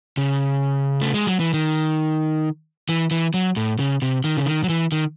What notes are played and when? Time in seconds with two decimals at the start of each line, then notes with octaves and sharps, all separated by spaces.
0.17 C#3
1.01 A3
1.14 G#3
1.27 F#3
1.40 E3
1.53 D#3
2.89 E3
3.11 E3
3.34 F#3
3.56 A2
3.79 C#3
4.02 C3
4.24 D#3
4.37 C#3
4.46 D#3
4.64 F#3
4.69 E3
4.92 D#3